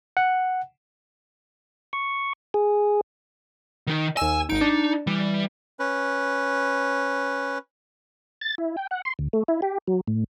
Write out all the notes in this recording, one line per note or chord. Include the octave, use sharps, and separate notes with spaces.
F#5
C#6
G#4
D#3 D#4
D#2 G#5 E6
G#1 D#4 D7
D4
E3 G3
C#4 B4
A6
E4
G5
F#5
C6
D2
A3
E4
G4
F#3
A2